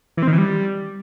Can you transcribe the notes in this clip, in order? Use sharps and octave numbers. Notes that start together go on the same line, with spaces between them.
E3
C4
D#3
E3
G3